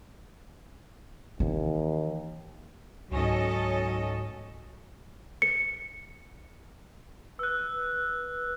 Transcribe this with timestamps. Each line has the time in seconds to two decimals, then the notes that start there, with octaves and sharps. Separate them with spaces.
1.40 D#2 E3 C#4
3.11 C#2 G#2 F#3 C#4 A4 D#5
5.42 C#7
7.39 B4 E6 F#6